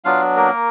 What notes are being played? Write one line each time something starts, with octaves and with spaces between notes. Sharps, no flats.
F#3 B3 D4 F4 F5
A#3 A#4